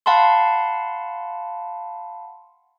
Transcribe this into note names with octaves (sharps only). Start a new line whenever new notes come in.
F5 F#5 A5 B5 C6